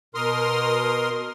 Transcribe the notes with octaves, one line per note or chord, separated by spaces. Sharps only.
B2 A#4 C6 D#6 F6